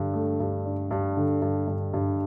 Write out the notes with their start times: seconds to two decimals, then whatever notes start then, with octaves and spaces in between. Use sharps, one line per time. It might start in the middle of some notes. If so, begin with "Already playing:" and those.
Already playing: G2 D3
0.14 A3
0.40 G2
0.65 D4
0.91 G2
1.17 D3
1.42 G2
1.68 G2
1.94 G2